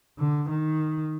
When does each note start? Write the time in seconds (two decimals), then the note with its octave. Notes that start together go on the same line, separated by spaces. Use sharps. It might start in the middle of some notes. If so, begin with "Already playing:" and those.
0.19 D3
0.49 D#3